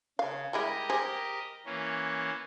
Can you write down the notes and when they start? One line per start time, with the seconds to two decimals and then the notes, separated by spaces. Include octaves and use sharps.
0.19 C#3 F5
0.53 G3 G#3 E4 G4 A#4 D#5
0.90 G3 G#4 C5
1.65 E3 A#3 C#4